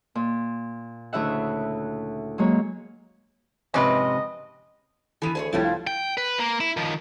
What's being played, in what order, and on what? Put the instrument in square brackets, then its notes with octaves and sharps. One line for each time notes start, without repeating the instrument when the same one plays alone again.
[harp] A#2
D2 C#3 E4 E5 F#5
F#3 G#3 A#3 C#5
[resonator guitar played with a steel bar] F2 G#2 C3 [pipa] C#4 B4 [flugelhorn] D#5
[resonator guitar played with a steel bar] E3 B3 [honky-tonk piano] A4 D#7
[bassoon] D2 [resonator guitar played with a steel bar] G#4 C5 C#5
[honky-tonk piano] C2 F3 A6 [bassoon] A2 [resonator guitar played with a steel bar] G3 A3 E4
[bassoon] F4
[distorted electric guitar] G5
B4
A#3
E4
D#3 F3